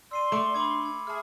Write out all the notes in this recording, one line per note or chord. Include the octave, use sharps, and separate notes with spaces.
D5 C6 E6 C7 D#7
A3 D6 C#7 D7
D4 B5 D6 G#6
C6 G#6
G#4 E5 A5 F6